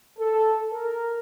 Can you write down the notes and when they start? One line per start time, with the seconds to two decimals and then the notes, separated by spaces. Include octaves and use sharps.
0.18 A4
0.72 A#4